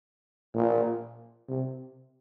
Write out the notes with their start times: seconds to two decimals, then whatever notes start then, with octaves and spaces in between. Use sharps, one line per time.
0.54 A#2
1.48 C3